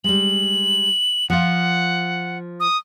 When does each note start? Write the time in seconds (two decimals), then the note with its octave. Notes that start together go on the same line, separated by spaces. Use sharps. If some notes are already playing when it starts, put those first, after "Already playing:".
0.04 G3 G#3 F#7
1.30 F3 F4 F#5
2.60 D#6